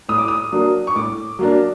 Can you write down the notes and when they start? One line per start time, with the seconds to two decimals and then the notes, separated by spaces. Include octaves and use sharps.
0.09 A2 D#6
0.18 D6
0.28 D#6
0.52 F#3 A#3 D4
0.87 C#6
0.96 A2 D6
1.39 F#3 A#3 D4